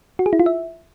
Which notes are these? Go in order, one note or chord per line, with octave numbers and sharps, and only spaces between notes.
F#4
G#4
E4
F4
E5